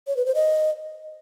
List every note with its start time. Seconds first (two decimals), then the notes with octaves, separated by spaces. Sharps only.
0.08 C#5
0.17 B4
0.26 C5
0.35 D#5